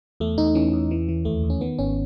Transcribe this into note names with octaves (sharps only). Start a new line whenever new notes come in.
E2 A3
E2 D#4
E3 C#4
E2
E3
E3
D#2 A3
D#2
C#4
D#3 B3
G#1 C#4